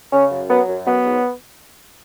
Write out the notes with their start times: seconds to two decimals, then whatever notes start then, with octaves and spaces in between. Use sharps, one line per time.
0.13 C#3 C#4
0.30 F#2
0.49 F#3 B3
0.68 F#2
0.85 F#3 B3
1.05 G#2